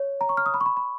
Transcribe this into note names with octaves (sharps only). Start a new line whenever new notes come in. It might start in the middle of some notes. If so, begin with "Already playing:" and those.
Already playing: C#5
A#5
C#6
F6
D#6
B5
C#6
B5
B5